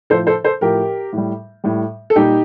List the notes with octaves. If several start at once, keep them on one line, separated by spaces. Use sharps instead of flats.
A2 F3 A4 C5
A4 C5
A4 C5
A2 F3 G4 A#4
A2 G3
A2 G3
A4
A#2 G3 D#4 G4